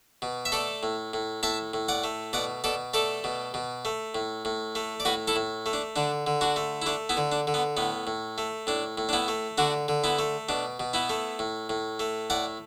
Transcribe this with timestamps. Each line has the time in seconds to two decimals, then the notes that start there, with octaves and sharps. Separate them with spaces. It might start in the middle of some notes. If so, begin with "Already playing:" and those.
0.22 B2
0.45 E5
0.52 A3 A4 D5
0.83 A2
1.13 A2
1.43 A2 E5 A5
1.74 A2
1.89 D5 F#5
2.04 A3
2.33 B2 D5 F#5
2.64 B2 A4 D5
2.94 A3 A4 D5
3.24 B2
3.54 B2
3.85 A3
4.15 A2
4.45 A2
4.75 A3
5.00 D5
5.05 A2 F#4 B4
5.28 E4 A4
5.36 A2
5.66 A3
5.73 D4
5.96 D3 D4
6.27 D3
6.41 D4 F#4
6.56 A3
6.82 E4
6.86 A3 D4
7.09 B3 E4
7.17 D3
7.32 D4
7.47 D3
7.54 B3
7.77 A2 B3
8.07 A2
8.38 A3
8.67 A2 D4
8.98 A2
9.09 D4
9.13 B3 E4
9.28 A3
9.58 D3 D4 F#4
9.88 D3
10.04 B3 E4
10.19 A3
10.49 B2 D4
10.80 B2
10.93 B3 E4
11.09 A3
11.39 A2
11.69 A2
12.00 A3
12.30 A2 D5 F#5